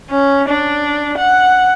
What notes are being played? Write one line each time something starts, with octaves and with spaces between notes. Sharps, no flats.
C#4
D4
F#5